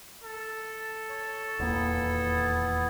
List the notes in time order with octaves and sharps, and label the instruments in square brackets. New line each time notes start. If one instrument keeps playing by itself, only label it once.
[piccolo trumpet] A4
[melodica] C#5
[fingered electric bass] D#1 E2 A#3 [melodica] B3 E4